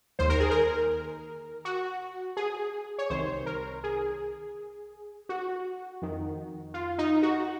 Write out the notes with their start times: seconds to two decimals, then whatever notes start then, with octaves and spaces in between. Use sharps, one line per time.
0.19 D#2 D#3 C5
0.30 A#4
0.40 G#4
0.51 A#4
1.65 F#4
2.37 G#4
2.98 C#5
3.10 C2 C3 D#3 C5
3.46 A#4
3.84 G#4
5.29 F#4
6.02 F2 D#3
6.74 F4
6.98 D#4
7.23 F#4